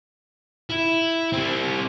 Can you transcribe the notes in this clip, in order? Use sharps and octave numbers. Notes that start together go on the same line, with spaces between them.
E4
G3 C4